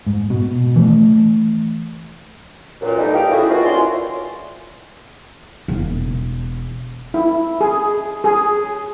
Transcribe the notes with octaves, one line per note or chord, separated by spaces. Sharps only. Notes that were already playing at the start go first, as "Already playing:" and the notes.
G#2
B2
E3 A3
C#2 F#2 A#2
E3 G3 A3 D#4
G4 G#4 F5 G5
A2 C#3 C#4 E4 F#4 G#4
D#3 F3 B3 F4 F#4
C2 G3 C#4 E4 D5 C6
E1
E4
G#4
G#4